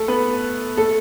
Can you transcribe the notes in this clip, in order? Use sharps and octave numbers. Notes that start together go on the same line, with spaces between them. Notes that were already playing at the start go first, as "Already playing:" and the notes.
Already playing: A3 A4
B3 B4
A3 A4